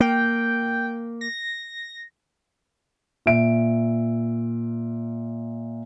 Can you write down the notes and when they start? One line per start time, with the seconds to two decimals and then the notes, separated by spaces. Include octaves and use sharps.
0.01 A#3 G5
1.21 A#6
3.26 A#2 E5 D7